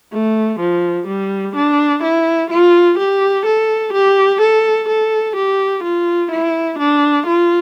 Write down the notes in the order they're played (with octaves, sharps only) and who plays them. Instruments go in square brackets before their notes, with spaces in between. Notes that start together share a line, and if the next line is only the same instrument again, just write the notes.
[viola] A3
F3
G3
D4
E4
F4
G4
A4
G4
A4
A4
G4
F4
E4
D4
F4